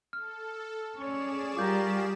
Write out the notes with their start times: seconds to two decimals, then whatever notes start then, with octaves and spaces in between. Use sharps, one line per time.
0.13 A4 F6
0.97 C#4 G#4 C#5 D5 E7
1.57 G3 F4 G4 A#4 C#6 D6 G6